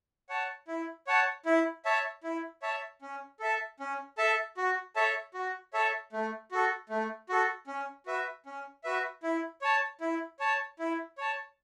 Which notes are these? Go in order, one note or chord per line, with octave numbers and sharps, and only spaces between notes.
C#5 F#5 A5
E4
C#5 F#5 A5
E4
C#5 E5 A5
E4
C#5 E5 A5
C#4
A4 E5 A5
C#4
A4 E5 A5
F#4
A4 C#5 E5 A5
F#4
A4 C#5 E5 A5
A3
F#4 A4
A3
F#4 A4
C#4
F#4 B4 E5
C#4
F#4 B4 E5
E4
C#5 A5
E4
C#5 A5
E4
C#5 A5